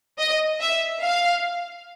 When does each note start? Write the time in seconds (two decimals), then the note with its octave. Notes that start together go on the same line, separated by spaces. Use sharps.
0.19 D#5
0.61 E5
1.04 F5